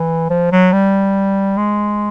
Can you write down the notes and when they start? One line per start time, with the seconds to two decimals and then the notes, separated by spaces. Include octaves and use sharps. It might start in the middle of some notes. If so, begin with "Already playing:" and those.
Already playing: E3
0.30 F3
0.52 F#3
0.72 G3
1.57 G#3